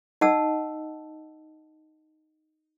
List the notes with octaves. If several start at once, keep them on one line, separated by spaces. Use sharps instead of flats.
D#4 D#5 F#5 A5 E6